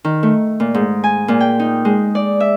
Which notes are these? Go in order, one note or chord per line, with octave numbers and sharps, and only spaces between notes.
D#3
A3
A#2
G#2
G#5
A#2
G5
D#4
G#3
D5
E5